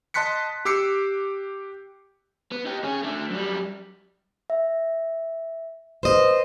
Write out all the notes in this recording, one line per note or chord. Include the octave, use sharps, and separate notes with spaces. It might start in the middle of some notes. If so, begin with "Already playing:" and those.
D#5 A5 C6 F#6 B6 C#7
G4 D6 E6 C7 C#7
B3
D#4 G4
C#4 G#4
A3 D4
F#2 G3
E5
B4 C5 D#5